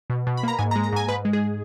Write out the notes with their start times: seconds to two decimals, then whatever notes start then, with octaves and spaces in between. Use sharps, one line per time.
0.10 B2
0.27 B2
0.37 B5
0.43 A#3 A#5
0.59 G#2 G#5
0.71 A#5
0.76 G#3
0.83 A#5
0.93 G#2 G#5
1.08 G#2 B4
1.25 G#3
1.33 G#4